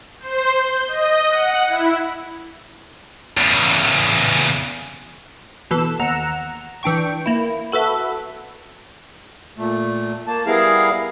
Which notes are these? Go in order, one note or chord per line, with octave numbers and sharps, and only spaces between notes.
C5
G6
D#5
F#5
E4
E2 C#3
B2 E3 A4 E6
D#2 F#5 A#5 E6
E3 D4 G5 C#6
A#3 E4
F#4 A4 B4 E5
A#2 A3
A#3 A5
G3 B3 E4 G#4 A#4 F5